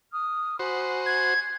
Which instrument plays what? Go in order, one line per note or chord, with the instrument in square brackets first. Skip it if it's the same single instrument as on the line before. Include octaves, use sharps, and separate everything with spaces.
[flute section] D#6 F6
[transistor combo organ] F#4 C5 [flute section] G#5 B5
[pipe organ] G#6